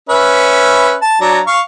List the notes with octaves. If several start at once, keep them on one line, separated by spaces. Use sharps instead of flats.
C#4 B4 E5
A5
F#3 D4 A#5
F5 C#6